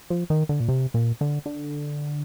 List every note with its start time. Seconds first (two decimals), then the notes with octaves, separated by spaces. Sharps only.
0.10 F3
0.30 D#3
0.49 D3
0.60 A#2
0.69 C3
0.94 A#2
1.21 D3
1.46 D3